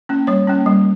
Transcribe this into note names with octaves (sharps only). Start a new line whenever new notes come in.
A#3 C#4
G3 C#5
A#3 C#4
G3